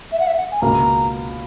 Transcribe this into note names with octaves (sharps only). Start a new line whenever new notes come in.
E5
F#5
E5
F#5
G#5
C#2 B2 A#3 A#5